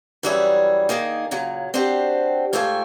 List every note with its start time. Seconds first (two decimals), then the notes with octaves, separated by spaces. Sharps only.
0.23 F#2 E3 G3 G#4 C#5 E5
0.89 D#3 A#3 D#4 G#4
1.31 A#2 C#3 F#3
1.74 C4 D4 F#4 G4 C5
2.53 G#2 A3 F4 E5 G5 G#5